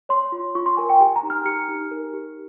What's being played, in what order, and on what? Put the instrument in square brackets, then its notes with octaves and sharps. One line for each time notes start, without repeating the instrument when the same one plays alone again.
[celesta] C#5 C6
F4
F4 C#6
C6
A#4 G#5
G5
G4 G#5
A#5
D#4
F6
G4 C#7
D#4
A#4
G4